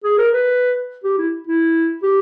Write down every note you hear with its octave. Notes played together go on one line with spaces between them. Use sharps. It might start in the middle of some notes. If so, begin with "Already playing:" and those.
G#4
A#4
B4
G4
E4
E4
G4